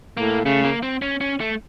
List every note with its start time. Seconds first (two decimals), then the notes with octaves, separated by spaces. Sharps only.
0.17 A2 A#3
0.45 C#3 A3
0.64 A#3
0.83 C4
1.02 C#4
1.21 C#4
1.40 A3